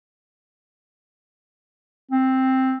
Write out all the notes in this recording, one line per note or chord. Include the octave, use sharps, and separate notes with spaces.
C4